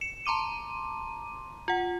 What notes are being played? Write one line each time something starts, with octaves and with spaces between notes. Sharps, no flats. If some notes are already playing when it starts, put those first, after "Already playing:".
C#7 E7
A5 A#5 C6 D6 D#7
F4 F#5